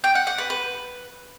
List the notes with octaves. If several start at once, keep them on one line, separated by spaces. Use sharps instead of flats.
G5
F#5
F#5
B4
B4